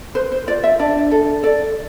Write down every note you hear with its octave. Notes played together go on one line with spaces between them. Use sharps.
B4 C5
C5
F4 D5
E5
D4 D5
A4
A4 D5